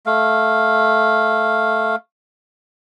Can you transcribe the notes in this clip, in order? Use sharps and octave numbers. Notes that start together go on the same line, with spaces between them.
A3 F5